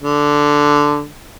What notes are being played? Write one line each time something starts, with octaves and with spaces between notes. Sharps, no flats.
D3